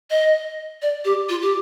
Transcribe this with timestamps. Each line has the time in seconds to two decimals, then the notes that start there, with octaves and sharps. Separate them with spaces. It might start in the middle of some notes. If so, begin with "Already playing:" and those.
0.10 D#5
0.82 D5
1.05 G4
1.29 F4
1.42 G4